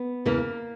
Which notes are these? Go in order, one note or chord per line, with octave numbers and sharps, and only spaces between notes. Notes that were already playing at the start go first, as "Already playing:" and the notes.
Already playing: B3
E2 C#3 E3 A#3